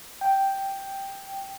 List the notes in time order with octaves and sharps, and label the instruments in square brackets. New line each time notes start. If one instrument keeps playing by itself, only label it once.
[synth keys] G5